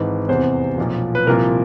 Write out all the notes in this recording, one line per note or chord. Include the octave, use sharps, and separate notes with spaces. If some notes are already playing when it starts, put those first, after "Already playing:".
Already playing: G#1 G#2 E3
F1 E2 C3 C5
B1 A#2 F3
B4
C2 A#2 F3 A#4